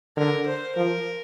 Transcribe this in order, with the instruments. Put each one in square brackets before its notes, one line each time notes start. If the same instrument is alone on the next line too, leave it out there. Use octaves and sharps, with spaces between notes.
[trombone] D3 [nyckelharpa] A#4
[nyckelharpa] C5
[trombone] F3 [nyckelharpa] A#4